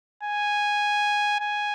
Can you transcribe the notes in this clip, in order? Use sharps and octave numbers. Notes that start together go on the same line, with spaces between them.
G#5
G#5